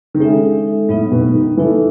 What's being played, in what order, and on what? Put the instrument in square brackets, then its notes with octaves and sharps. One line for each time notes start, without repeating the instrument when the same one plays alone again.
[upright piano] D#3
[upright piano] C#3 [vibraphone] G#3 D#4 A4 E5
[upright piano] A2 [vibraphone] F#3 B3 D#4
[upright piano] B2
D#3
[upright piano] E3 [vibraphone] A3 D#4 A4